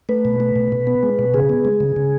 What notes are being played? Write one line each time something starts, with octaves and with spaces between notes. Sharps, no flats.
A3 B4
B2
A3
B2
B2
B3
G#3
B2
C#3 G#4
B3
G#3
C#3
C#3